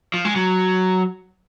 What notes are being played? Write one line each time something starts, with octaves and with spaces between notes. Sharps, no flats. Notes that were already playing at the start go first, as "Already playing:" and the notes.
F3
G#3
F#3